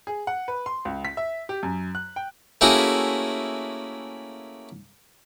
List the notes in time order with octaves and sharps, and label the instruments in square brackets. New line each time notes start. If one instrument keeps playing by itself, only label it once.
[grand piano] G#4
F#5
B4
C6
C#2
B6
E5
G4
F#2
F#6
G5
[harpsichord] A3 A#3 C#4 E4 F#4 G#4